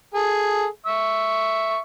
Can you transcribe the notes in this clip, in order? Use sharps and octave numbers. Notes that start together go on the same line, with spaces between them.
G#4 A4
E5 C#6 E6